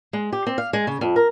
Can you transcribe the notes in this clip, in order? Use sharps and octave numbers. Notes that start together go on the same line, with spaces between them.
G#3
G4
C4
F5
G#3
C#3
F2
A#4